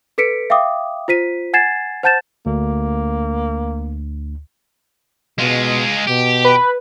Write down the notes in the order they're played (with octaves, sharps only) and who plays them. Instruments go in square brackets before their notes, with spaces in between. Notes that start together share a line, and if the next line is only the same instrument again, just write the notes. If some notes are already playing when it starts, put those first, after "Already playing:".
[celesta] A4 B4 B6 C#7 D7
E5 F5 G5 D6 D#6
F4 C5 B6 D#7
F#5 G#5 G#6 A6 C7 E7
C5 F#5 A5 G6 A6 E7
[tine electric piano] D2 [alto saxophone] A#3
[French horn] B2 [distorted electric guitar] G#3 F4
[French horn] B2 [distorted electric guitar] G4
[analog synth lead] B4